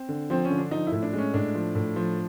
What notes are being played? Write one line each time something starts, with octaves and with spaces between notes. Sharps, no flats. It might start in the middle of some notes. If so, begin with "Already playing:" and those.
Already playing: C4
D3
F3 C4
C#4
D3
D4
F3 D#4
E4
A2
D4
G#3 C#4
A2 D4
F3
A2
F3